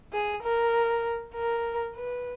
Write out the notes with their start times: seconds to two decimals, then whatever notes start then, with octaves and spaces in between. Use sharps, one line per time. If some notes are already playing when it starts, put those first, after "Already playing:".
0.13 G#4
0.43 A#4
1.35 A#4
1.96 B4